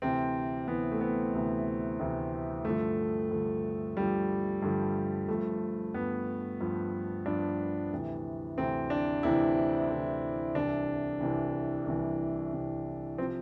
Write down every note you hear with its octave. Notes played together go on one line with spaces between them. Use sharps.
D2 C3 E3 C4
D2 C3 E3 B3
A3
B3
D2 C3 E3
D2 C3 E3
G2 D3 F3 A3
G2 D3 F3
G2 D3 F3 G3
G2 D3 F3
G2 F3 A3
G2 F3 B3
G2 F3
G2 F3 D4
D2 C3 E3
D2 C3 E3 C4
D4
D2 C3 E3 E4
D2 C3 E3
C2 C3 E3 D4
C2 C3 E3
C2 C3 E3
C2 C3 E3
C3 F3 C4